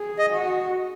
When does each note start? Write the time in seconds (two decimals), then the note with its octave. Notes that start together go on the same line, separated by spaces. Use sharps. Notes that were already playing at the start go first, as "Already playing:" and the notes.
Already playing: G#4
0.19 D#5
0.32 F#4